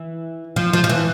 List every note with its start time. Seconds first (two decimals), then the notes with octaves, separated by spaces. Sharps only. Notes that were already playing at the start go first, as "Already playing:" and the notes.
Already playing: E3
0.56 F3
0.73 F3
0.84 F3
0.89 E3